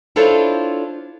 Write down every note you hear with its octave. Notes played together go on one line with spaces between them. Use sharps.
D4 E4 F4 A4 C5 C#5